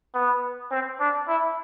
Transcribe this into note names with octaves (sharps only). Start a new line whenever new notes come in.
B3
C4
D4
E4